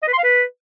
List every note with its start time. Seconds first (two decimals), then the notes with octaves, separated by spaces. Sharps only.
0.03 D#5
0.08 B4
0.13 C6
0.18 F5
0.24 B4